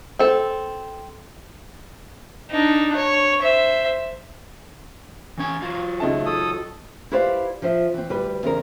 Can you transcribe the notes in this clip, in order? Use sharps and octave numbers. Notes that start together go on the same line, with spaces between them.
C4 A4
D4 D#4
C#5
C5 E5
E3 C#4 G#5
F#3 F4
C#2 A3 D#4 A5
A4 D#6
E4 G4 B4 C5 D5 F5
F3 C5 E5
E3 C4
D2 G3 B4
E2 C#3 C4 A#4